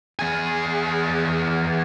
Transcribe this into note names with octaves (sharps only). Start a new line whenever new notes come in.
E2 G#4